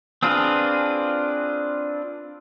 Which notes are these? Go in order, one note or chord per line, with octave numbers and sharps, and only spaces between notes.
C4 D4 F4 G#4 B4